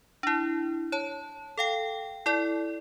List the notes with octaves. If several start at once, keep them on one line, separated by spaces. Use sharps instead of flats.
D4 E4
C#5 A5
A4 F5 G5
E4 A4 D5